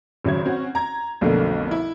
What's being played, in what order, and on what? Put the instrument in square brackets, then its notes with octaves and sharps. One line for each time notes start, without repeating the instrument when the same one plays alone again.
[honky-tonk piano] G#1 C#3 F#3 E5 G#6
C4 C#4 F#4
A#5 G#6
B1 F2 B2 D3 A3 A#3
E4